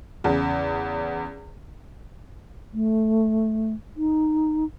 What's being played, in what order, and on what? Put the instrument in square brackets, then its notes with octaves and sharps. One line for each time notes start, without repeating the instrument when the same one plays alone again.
[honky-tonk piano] E2 C#3
[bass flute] A3
D#4